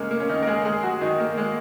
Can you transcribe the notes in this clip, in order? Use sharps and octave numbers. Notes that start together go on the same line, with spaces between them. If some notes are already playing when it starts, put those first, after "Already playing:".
Already playing: C#3 G#3 A#3 C#4
A#3
C#4
D#3 D#4
A#4
G#3 G#4
G#3 G#4
F#3 F#4
D#3 D#4
A#3
G#3